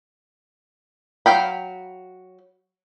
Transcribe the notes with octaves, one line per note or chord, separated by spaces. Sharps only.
F#3 F5 G5 B5